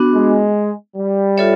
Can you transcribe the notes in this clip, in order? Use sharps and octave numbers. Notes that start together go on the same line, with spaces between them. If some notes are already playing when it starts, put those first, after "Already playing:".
Already playing: B3 D4 F#4
G#3
G3
F4 A4 C#5 E5